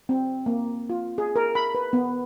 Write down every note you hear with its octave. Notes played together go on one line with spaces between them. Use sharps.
C4
A#3
F4
G#4
A#4
B5
B4
B3